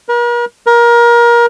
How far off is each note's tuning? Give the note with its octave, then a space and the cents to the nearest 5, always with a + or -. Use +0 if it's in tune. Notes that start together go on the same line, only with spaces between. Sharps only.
A#4 +45
A#4 +25